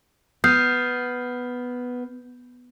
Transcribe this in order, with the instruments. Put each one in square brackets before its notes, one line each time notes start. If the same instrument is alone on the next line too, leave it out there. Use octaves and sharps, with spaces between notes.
[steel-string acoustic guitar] B3 [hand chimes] D#6 F6 C7 [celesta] G6